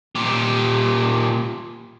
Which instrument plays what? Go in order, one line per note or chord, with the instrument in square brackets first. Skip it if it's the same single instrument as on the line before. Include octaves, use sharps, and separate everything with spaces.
[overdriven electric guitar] A#2 G4